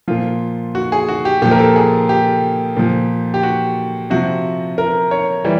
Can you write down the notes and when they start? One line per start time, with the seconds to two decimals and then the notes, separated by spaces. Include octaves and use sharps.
0.08 A#2 F3 F4
0.75 F#4
0.92 G#4
1.09 F#4
1.25 G4
1.42 A#2 F3 G4
1.51 A#4
1.59 A4
1.76 G#4
2.09 G4
2.77 A#2 F3
3.34 G4
3.43 F#4
4.10 C3 F3 F#4
4.78 A#4
5.11 C#5
5.45 E3 G3